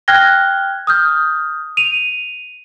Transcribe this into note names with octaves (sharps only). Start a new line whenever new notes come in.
G5 F6 F#6 G#6 A#6 G7
D#6 F6 G6
D#7 F7